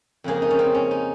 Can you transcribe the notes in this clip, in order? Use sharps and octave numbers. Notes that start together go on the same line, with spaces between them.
F2 C#3 F3 A#3 G#4
D#4
C#4
C4
C#4
D#4